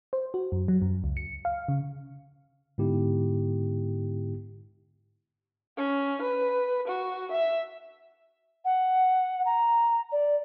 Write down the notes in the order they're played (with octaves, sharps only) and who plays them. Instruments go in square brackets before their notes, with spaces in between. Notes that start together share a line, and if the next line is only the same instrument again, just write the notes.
[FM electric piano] C5
F#4
F#2
F#3
F#2
C#2
C#7
F5
C#3
[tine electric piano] G#2 D3 B3 E4 G4
[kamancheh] C#4
B4
F#4
E5
[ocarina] F#5
A#5
D5